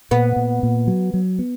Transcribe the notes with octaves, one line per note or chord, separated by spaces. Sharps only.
A#2 B3
A#2
A#2
F#3
F#3
B3